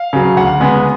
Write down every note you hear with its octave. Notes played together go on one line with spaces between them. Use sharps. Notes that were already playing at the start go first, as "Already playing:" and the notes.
Already playing: F5
C#3 F#3
D2 F#5
C#3 G#3 B3